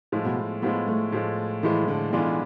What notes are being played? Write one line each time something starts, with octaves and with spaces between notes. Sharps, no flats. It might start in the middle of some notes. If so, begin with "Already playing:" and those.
A2 F3 G#3
B2
A2 F3 G#3 B3
A3
A2 F3 G#3
A2 E3 F3 G#3
D3
B1 B2 E3 G#3 D4 F4